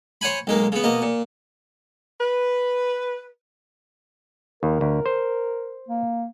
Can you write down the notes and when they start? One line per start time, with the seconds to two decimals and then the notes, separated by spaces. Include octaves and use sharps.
0.21 C5 C#5 F#5 G#5 B5
0.47 B1 G#3 A#3
0.72 C#3 B3
0.84 B2 A#3 D#5
1.02 A#2
2.21 B4
4.63 D#2 A#4
4.81 D2
5.06 C5
5.88 A#3